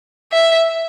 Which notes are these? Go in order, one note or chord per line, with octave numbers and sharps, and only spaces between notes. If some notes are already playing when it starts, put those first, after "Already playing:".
E5